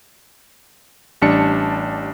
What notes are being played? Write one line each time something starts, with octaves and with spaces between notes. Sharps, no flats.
A1 G3 D4 A5 C#7